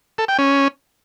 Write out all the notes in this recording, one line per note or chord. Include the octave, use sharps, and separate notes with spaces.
A4
G5
C#4